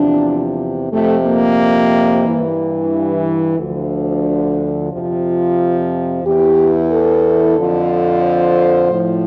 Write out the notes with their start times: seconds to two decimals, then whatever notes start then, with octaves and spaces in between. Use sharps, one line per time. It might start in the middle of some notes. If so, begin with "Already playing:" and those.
Already playing: E2 C3 F3 D4
0.92 F2 C3 F3 A3
1.26 A#3
2.25 G2 E3
3.58 D2 D3 F3
4.91 F2 C3 F3 F4
6.24 E2 E3 G4
6.91 A4
7.57 F2 D3 F3
8.23 C5
8.90 A2 F3